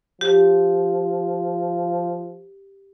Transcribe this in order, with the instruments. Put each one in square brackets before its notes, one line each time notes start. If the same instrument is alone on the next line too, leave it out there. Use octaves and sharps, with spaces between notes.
[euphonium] F3 [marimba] G4